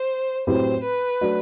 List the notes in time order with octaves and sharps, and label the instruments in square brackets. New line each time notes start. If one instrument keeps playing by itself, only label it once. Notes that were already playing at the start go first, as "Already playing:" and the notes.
Already playing: [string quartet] C5
[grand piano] A2 F#3 C4 G4 B4 [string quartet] C5
[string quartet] B4
[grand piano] F#3 A3 D4 F#4